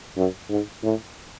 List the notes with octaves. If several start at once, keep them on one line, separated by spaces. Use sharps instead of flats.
F#2
G#2
A2